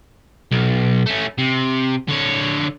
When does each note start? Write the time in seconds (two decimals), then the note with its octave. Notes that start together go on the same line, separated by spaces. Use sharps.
0.51 B1
1.06 A3 C#4
1.38 C3
2.08 D3 C#5